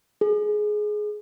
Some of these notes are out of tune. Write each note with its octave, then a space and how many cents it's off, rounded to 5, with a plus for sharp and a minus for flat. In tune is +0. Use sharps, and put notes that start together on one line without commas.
G#4 +15